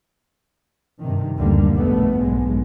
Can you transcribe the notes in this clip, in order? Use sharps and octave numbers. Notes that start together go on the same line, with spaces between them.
G2 C3 D#3
F#1 D2 D3 G3 A#3
A#1 D#2 G#2 B2 A3 B3
B1 G#2 G#3